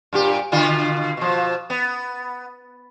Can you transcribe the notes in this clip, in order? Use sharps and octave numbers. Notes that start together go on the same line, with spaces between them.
G2 A#2 G4
B2 D3 F4
B2 F3
B3